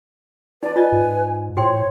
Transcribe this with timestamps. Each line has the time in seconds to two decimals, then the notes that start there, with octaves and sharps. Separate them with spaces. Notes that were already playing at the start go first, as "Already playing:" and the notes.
0.63 D#4 B4 D5 A5
0.76 F4 D5 D#5 G#5
0.92 G#2
1.57 A2 F#4 C5 C#5 G5 C6